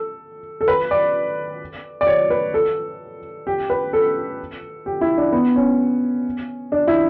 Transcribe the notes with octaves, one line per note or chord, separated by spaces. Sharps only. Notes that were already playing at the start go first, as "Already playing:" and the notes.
Already playing: A4
A4
B4
D5
D5
C#5
B4
A4
G4
B4
A4
G4
E4
D4
B3
C#4
D4
E4